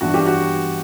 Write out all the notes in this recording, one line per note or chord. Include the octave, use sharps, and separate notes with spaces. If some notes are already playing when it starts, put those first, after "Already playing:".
G2 E3 B3 D4 F#4
G4
F#4